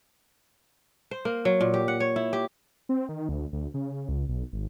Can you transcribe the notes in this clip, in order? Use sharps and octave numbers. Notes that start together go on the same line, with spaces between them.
C5
A#3
F#3
A#2
G4
F#5
C#5
E4
G4
C4
D#3
D2
D2
C#3
C#2
B1
G#1